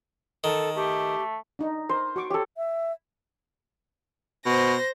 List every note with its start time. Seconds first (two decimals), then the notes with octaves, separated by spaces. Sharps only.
0.44 D#3 A4
0.76 A3 G4
1.59 D4 D#4
1.89 A#4 C5
2.16 F#4 C#6 D6
2.30 G4 A4 C#5
2.57 E5
4.45 B2 C5 A#6